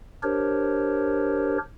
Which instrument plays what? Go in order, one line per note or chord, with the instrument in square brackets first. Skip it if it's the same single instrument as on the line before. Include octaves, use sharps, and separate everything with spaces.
[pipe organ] D4 G4 A#4 C5 C#5